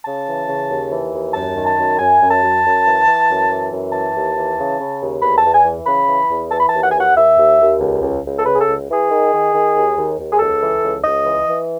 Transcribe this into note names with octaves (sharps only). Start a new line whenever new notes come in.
C#3 A5
E3
C#3
D#2
E3
D#2
F#2 A5
D#3
A5
F#2
F#2 G#5
F#2
A5
F#2
F#2
E3
E3
F#2
E3
F#2
E3 A5
D#2
E3
C#3
C#3
D#2
E2 B5
A5
E2
G#5
E3
C#3 B5
E3
E2
E3 A5
B5
D#2 A5
F#5
D#2 G#5
F#5
D#2 E5
D#2
D#2
C#2
C#2
C#2
A4
C#3 B4
G#4
A4
C#2
E3
G#4
D#3
D#3
D#3
D#2
D#2
D#2
G#4
C#2 A4
E3
C#2
C#2 D#5
E3
E3